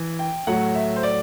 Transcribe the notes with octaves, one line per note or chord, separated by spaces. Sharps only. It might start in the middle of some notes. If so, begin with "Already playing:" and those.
Already playing: E3
G5
A2 F#3 A3 F#5
E5
C5
D5